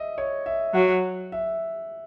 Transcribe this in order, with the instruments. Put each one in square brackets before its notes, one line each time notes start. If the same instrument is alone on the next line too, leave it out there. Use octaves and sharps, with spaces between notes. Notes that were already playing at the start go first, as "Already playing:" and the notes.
Already playing: [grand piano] D#5 E5
C#5
E5
[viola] F#3 [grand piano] F#5
[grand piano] E5